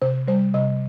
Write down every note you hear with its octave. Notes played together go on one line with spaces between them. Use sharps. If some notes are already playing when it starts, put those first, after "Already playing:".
C3 C5
G3 C5
C3 D#5